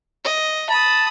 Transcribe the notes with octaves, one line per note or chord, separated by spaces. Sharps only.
D#5
A5 B5 D#6